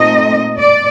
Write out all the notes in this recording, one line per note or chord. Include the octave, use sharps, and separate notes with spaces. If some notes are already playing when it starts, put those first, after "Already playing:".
Already playing: A#2 A3 C4 D#4 D#5
D5